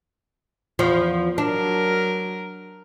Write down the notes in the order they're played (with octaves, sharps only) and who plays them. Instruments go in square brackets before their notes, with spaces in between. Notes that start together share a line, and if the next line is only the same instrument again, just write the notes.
[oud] E2 F3
[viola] F#3 A#4 [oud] D4